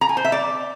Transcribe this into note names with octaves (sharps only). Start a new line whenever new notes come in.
A#5
G#5
C5
E5
D5